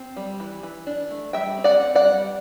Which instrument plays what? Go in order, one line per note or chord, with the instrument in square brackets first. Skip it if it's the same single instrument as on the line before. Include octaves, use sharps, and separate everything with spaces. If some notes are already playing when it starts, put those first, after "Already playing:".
Already playing: [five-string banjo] C4
G3
E3
E3
D4
A3
G3 E5 G5
C4
D5 F#5
C4
D5 F#5
G3